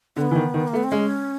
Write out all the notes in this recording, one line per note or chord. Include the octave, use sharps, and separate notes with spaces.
D3 C4
B3
E3
D#3
D#3
A#3
A3
B3
C4
G#3 C#4